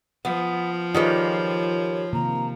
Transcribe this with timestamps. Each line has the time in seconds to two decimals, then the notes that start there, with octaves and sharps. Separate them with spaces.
0.25 F3 B3
0.95 D#3 G3 A#3 F4 G#4 B4 C#5
2.13 C3 D#3 A#3 A#5